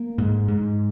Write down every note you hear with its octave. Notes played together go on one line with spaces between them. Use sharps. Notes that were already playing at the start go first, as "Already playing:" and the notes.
Already playing: A#3
G#2
G#2